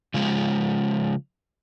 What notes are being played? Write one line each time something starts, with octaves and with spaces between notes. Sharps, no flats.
C#3 F3 G#3